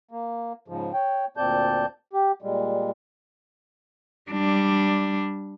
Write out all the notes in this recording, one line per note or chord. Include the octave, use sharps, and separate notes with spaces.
A#3
G#2 C#3 F3
C#5 G5
D2 A#2 C4 D5 A5 G6
G4
A#2 G3 G#3
G3 D4